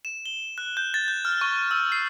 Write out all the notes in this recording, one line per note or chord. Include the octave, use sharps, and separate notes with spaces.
E7
G7
F#6
G6
A6
G6
F6
C#6
E6
C7